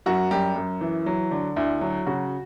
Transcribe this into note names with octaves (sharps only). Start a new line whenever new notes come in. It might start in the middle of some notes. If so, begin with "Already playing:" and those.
F#2 F#4
F#2 G3 G4
F#2
E3
F#3
D3
D2 E4
F#3
C#3 F#4